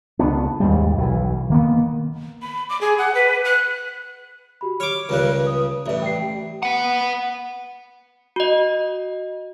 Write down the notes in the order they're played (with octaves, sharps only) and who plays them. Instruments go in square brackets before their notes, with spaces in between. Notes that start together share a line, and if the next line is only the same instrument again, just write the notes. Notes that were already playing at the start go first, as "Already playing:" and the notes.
[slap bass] C#2 B3 D4
D#2 G#2 G3
B1 E3
D#3 A#3 B3
[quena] B5
D6
G#4
F#5
B4
F#6
[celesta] F#4 G4 B5
[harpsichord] C#5 D6 [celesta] F6
[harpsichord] C#2 G2 C#3 [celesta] A#4 C#5 F#6
[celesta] D#6
[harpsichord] A1 G2 [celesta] D5 E5
[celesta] G5 C7
[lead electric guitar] B4 F#5
[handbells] F#4 D#5